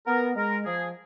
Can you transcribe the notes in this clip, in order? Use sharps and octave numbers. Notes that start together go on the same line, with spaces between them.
B3 A#4
G#3 A#4
F3 G#4